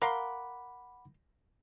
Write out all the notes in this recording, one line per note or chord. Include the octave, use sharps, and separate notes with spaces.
A#4 F5 F#5 B5 C6 D6